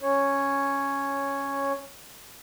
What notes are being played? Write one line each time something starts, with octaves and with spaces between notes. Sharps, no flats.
C#4 C#5